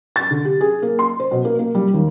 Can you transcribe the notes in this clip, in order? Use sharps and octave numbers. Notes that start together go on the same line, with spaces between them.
A6
D3
G4
G#4
A#3
C6
C5
B2
A#3
A#3
G3
D#2